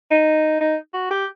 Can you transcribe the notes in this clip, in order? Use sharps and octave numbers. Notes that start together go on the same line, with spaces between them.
D#4
D#4
F#4
G4